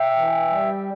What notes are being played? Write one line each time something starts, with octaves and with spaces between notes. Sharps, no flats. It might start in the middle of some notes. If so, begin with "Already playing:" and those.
Already playing: E5 G5
E3
G3